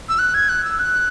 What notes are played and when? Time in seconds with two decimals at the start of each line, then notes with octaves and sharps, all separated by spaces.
0.09 E6
0.19 F#6
0.34 G#6
0.49 F#6
0.64 E6
0.79 F#6